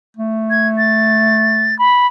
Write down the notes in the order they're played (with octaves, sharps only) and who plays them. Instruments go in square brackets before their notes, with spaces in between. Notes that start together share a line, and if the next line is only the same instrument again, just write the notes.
[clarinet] A3
[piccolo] G#6
A6
B5